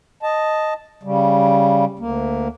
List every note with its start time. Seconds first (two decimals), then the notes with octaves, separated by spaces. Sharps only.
0.23 D#5 A5
1.03 C#3 G3
1.99 D2 A#3